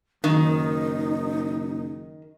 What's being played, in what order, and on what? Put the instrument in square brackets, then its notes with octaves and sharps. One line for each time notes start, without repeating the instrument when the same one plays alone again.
[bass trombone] F#1 [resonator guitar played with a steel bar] D#3 [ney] D#4